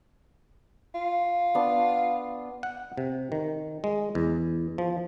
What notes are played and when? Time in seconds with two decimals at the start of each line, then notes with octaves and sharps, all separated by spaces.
0.95 F4
1.55 B3 D4
2.63 F#5
2.98 C3
3.32 D#3
3.84 G#3
4.15 E2
4.78 F3